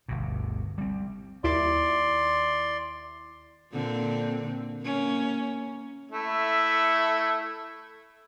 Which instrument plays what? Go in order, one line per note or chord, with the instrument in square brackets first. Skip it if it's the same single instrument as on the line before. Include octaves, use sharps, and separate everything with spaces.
[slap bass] G1 D2 B2
G3 C4
[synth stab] D#2 E4 D6 [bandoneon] D5 C6
[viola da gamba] A#2 D3 C4
A#3 C#4
[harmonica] A3 E4